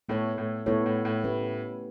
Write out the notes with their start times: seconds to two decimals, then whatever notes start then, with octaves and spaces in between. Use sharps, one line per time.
0.09 A2 B3 E4 A4 C#5
0.38 A2
0.66 A2 B3 E4 A4 C#5
0.86 A2
1.05 A2
1.24 A3 C#4 G4 B4